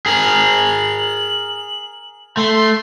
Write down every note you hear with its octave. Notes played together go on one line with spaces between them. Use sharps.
G#4 A#4 F#7
A3 C6